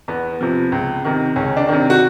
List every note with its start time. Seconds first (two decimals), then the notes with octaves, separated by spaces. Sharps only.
0.08 E2 B3
0.41 C3 F3
0.72 C#2
1.05 C3 D#3
1.36 C#2 C#4
1.57 D4
1.68 C3 D#3
1.90 F#4